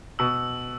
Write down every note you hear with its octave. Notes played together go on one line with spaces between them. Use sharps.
B2 E6